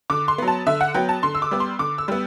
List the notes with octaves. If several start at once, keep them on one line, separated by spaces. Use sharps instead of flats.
D3 D6
C6
F#3 B3
A5
D3 E5
F#5
F#3 B3 G5
A5
D3 C6
E6
D6
G3 B3
C6
D3 D6
E6
G3 B3